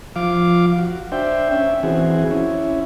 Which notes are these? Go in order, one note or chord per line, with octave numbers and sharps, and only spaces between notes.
F3 F5 D6
F#4
D4 C5 E5 G5
C#4 E5
E3 C4 F#4 G#4
C#4 E4